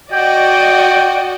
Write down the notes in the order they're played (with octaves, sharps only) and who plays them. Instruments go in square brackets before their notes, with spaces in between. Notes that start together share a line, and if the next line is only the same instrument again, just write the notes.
[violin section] F#4 D5 D#5 [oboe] G5